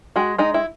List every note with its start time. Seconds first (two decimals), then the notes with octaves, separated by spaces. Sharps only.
0.16 G#3 F#4
0.38 G#3 D#4
0.54 E4